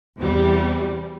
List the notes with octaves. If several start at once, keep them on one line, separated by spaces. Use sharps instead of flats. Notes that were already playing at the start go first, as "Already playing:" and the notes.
E2 C3 G3